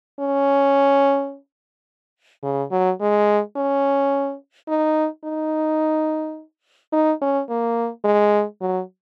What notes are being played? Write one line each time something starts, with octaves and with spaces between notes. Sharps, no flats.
C#4
C#3
F#3
G#3
C#4
D#4
D#4
D#4
C#4
A#3
G#3
F#3